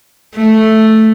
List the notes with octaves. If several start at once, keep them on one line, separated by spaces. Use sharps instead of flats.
A3